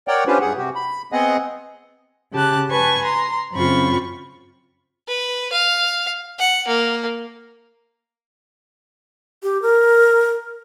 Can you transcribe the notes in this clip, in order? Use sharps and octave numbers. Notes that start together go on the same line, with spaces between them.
A#4 C#5 D5 F#5 G5
C#4 D4 F4 G4 B4 C5
G2 G#4 F#5
C3 F#4 G4
B5
B3 C4 G#4 D#5 F#5
C#3 G4 A5 F#6
B4 G#5 A5 B5 C#6
A#5 C6
F#2 C#3 C4 F4 B5 C#6
B4
F5
F#5
A#3
G4
A#4